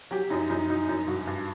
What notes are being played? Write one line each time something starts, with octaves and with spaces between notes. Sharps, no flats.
F#3 G4
F#2 D#4
F#2 D#4
F#3 D#4
F#2 D#4
G2 F#4
G2